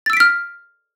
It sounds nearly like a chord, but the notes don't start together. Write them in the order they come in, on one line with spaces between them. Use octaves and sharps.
A6 E6 D7 B6 F6